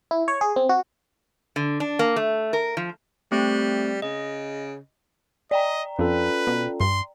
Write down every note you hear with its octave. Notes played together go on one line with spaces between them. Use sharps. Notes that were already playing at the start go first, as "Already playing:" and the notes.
E4
C#5
G#4
C4
F#4
D3
D4
A#3
A3
A#4
F3
G3 A3 C4
C#3 D#5
D5 D#5 G5 A#5
F2 C#4 F4 A4 B4
B2
G2 C6